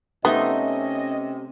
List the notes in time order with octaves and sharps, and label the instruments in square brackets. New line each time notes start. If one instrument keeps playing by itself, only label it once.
[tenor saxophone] C3 [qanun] A3 D#4 C6 [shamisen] B3 [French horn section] C#4 D#5